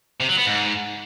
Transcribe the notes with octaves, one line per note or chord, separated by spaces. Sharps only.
C3
F#3
B3
G#2